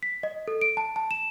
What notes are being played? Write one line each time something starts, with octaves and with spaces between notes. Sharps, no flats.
B6
D#5
A4
D7
A5
A5
E7